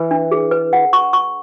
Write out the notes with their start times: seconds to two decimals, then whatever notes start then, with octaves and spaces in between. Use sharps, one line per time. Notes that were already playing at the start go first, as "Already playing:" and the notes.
Already playing: E3 B4
0.11 D4
0.32 G#4
0.51 B4
0.73 F#5
0.93 C#6
1.13 C#6